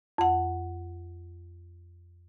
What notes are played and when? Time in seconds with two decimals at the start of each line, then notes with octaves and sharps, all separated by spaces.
0.18 F2 F#5